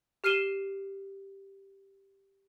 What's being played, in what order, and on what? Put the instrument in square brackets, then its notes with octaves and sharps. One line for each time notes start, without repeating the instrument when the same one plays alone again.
[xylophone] G4 F6 C7 D#7 E7 G7